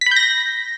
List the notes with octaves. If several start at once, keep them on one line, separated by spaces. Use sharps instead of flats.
B6
B5
G6
A#6